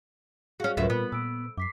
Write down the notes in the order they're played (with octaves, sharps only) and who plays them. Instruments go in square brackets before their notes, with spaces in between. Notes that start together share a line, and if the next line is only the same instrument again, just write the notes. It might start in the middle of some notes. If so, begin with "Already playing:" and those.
[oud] C#4 F#4 [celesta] G#4 F5
[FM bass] C#2 [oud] F#2 A2 E5 [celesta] F4 A#4 B4
[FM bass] A#2 [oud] B3
[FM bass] A#2 [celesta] E6 D7
[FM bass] F#2 [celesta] D6 B6 C7